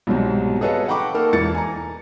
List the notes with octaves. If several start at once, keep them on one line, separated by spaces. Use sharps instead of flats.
C2 G#2 B2 F#3 C4
G#4 A4 B4 C#5 D#5 F5
F#5 G5 A#5 B5 C#6 D6
A#3 D#4 A4 A#4
E1 E3 A6 C#7
G#5 A#5